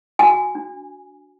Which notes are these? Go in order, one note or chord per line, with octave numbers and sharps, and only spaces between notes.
F#4 G#5
D4